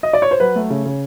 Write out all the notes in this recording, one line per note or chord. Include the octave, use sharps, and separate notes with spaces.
D#5
D5
C#5
C5
F#3 B4
A3
C#3
C#3